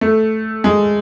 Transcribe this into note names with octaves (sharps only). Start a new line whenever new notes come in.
A3
G#3